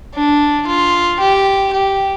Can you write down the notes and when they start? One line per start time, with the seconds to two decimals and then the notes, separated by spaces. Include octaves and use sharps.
0.15 D4
0.67 F4
1.20 G4
1.73 G4